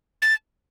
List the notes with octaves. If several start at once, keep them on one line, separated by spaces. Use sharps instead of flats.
A6